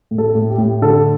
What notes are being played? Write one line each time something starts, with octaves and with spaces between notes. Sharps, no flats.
A2
A4
A2
G4
A2
D3 A4